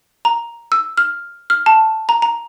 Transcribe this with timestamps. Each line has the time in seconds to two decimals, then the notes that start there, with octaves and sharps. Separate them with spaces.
0.25 A#5
0.72 E6
0.97 F6
1.50 F6
1.66 A5
2.09 A#5
2.22 A#5